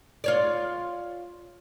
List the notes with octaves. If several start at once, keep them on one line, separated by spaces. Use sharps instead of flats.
F4 C#5 D5